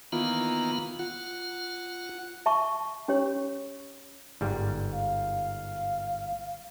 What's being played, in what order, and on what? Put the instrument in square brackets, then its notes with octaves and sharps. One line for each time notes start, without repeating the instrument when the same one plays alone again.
[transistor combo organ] D#3 E3 A#3 [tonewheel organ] B3 F4
[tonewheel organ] F4 [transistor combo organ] F#5
[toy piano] E5 A5 B5 C#6
C#4 G4 C#5
[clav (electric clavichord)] G1 G#2 G3
[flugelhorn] F5